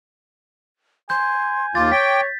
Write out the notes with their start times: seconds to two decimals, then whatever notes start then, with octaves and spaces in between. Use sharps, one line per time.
1.10 G#5 C6 G6
1.75 D#2 F4 D6 A6
1.92 C#5 G5 B6